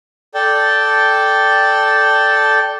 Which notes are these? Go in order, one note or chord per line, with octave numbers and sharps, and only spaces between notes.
A4 D5 G5 A5